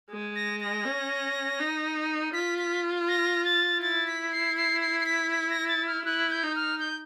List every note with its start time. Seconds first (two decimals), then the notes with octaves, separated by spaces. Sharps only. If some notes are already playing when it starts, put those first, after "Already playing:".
0.10 G#3
0.36 A#6
0.60 A#6
0.85 C#4
1.59 D#4
2.33 F4 B6
2.58 B6
3.08 A#6
3.45 A6
3.82 E4 A6
4.07 B6
4.32 C7
4.57 C7
4.81 C7
5.00 C7
5.06 B6
5.31 B6
5.50 A#6
5.68 A6
5.87 F6
6.05 E4 F#6
6.30 G6
6.43 D#4
6.56 F6
6.80 G6